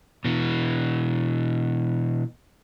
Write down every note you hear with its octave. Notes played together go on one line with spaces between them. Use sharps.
B2 E3